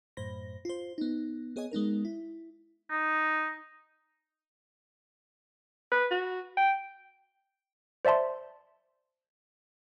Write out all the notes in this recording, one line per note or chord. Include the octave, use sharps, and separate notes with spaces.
F#2 A2 C5 B5 A#6
F4 C5
B3 D#4
B3 G#4 C#5 D#5 G#5
G#3 B3 D#4 A#4
E4
D#4
B4
F#4
G5
C5 D5 E5 A5 C6